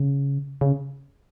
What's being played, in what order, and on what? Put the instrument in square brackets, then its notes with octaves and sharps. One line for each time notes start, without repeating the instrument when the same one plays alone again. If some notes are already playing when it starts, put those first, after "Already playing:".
Already playing: [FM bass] C#3
C#3